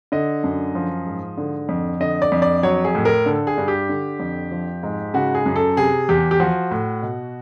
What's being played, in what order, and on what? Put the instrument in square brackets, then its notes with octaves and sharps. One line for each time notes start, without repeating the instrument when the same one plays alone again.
[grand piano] D3 D#5
F#2
F3
G#2
D3
F2
D3 D#5
D5
F2
D5
F#3 C#5
G#4
A2
A#4
D3 A4
G#4
G2
G4
D3
F2
F3
G#2
C#3 F#4
G#4
F#2
A4
C3 G#4
E2 G4
G4
F3 F#4
A2
B2